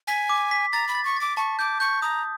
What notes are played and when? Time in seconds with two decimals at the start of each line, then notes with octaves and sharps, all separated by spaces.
0.07 G#5 B6
0.29 D6
0.51 B6
0.73 A#5 A6
0.89 B5
0.95 A6
1.05 C#6
1.17 D6 A6
1.37 A5 C#6
1.59 D6 G6
1.80 C#6 G6
2.02 A#5 D#6